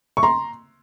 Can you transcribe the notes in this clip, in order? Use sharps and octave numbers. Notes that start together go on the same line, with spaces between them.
C#6
A#5 C6